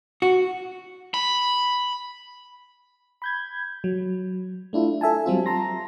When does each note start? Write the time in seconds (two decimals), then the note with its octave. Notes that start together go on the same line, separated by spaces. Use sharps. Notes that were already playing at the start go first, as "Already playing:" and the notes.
0.22 F#4
1.14 B5
3.22 B5 G6 G#6
3.84 F#3
4.73 A3 D4 E4 F4
5.01 A4 E5 G#5 A5
5.26 F#3 G3 C4 F4
5.46 A5 A#5 C6 A#6